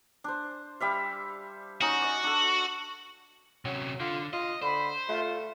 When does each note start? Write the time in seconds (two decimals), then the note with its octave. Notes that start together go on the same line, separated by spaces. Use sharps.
0.24 D4 C5
0.80 G3 E5 F5
1.81 C#4 D#4 F#4 D#5
2.01 D5 D#5
2.24 D4 A4
3.65 C3 F#3 C#4
4.00 D3 F4
4.33 F4 D#5
4.62 D3 C5 B5
5.09 A3 F4